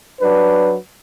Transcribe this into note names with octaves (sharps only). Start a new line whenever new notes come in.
F#3 D4 B4